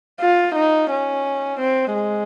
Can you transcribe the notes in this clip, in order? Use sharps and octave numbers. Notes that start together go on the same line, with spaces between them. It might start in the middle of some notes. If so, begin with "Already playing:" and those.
F4
D#4
C#4
C4
G#3